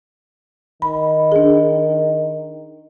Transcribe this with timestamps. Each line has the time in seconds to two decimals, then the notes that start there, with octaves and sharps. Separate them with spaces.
0.82 D#3 B5
1.32 D4 G#4